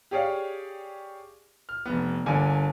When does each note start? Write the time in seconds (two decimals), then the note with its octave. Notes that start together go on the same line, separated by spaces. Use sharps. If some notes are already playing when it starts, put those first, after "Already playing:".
0.11 G4 G#4 C#5 D5 F5
1.69 F6
1.86 F1 B3
2.26 G1 D3 A#3 G#5